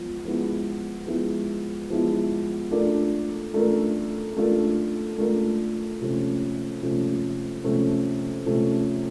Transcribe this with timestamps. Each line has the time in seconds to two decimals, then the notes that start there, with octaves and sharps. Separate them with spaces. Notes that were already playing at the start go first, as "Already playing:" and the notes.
Already playing: F3 G#3 B3
0.25 F3 G#3 B3 E4
1.07 F3 G#3 B3 E4
1.90 F3 G#3 B3 E4
2.71 A3 D4 F4 A#4
3.54 A3 D4 F4 A#4
4.37 A3 D4 F4 A#4
5.18 A3 D4 F4 A#4
6.01 C3 F3 A3 C#4
6.82 C3 F3 A3 C#4
7.64 C3 F3 A3 C#4
8.46 C3 F3 A3 C#4